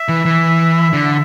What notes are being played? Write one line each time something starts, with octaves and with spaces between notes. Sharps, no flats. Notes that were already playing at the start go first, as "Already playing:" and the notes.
Already playing: E5
E3
E3
D3